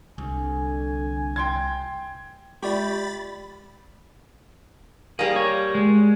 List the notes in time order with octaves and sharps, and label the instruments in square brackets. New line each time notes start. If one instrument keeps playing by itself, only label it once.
[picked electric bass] C2 [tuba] D3 [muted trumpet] G#5
[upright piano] G5 C6 G#6
[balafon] G#3 F4 [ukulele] G4 [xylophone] D5 E5 C#6 [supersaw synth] B5 A6
[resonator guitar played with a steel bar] G3 A#3 [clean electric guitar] G#4
[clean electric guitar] C#5
G#3